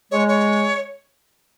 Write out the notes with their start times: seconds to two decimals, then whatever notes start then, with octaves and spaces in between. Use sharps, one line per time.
0.11 G#3 C#5
0.28 C#5